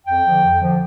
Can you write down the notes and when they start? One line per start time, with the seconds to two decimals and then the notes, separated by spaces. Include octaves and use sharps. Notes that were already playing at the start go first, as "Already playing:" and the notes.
0.07 F2 G5
0.25 D3 F3
0.43 F2
0.61 D3 F3